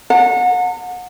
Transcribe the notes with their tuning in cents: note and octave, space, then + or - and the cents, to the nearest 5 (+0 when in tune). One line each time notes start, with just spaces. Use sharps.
F#5 -30 A#5 -45